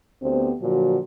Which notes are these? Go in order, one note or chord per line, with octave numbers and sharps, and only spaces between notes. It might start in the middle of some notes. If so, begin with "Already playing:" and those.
D2 B3 C4 G4 C5
A#2 D3 F3 F#3 F#4